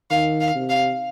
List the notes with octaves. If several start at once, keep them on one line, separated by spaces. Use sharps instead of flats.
D#3 F5
F5
C3
F5